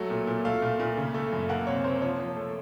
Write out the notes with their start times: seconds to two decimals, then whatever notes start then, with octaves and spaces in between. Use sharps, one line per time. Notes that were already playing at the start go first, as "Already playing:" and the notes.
Already playing: F#3 A3
0.10 A#2
0.27 A#2
0.45 A3 F5
0.62 A#2
0.80 A#2
0.97 C#3
1.14 A3
1.32 F#2
1.49 A#3 F#5
1.67 C3 C#5
1.84 A#3 C5
2.02 F3 C#5
2.19 F3
2.36 A3